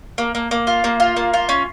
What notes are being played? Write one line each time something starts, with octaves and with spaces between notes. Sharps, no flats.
A#3
A#3
A#3
F4
A#3
F4
A#3
F4
C#4